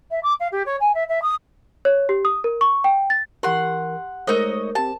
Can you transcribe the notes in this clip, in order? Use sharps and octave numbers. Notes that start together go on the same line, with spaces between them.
E5
D6
F5
G4
C#5
G#5
E5
E5
D#6
C#5
G4
D#6
A#4
C#6
G5
A6
E3 G4 A#4 F#5 C6
G#3 A3 D#4 A#4 C5 C#5 D#5
C4 G4 A5